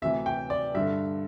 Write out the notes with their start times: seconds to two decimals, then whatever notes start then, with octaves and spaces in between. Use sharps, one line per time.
0.02 D2 C3 E3 E5
0.26 G5
0.50 D5
0.75 G2 D3 E5